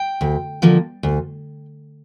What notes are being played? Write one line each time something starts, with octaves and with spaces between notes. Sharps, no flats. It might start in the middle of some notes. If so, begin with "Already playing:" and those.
Already playing: G5
D2
D3 F3 A#3
D2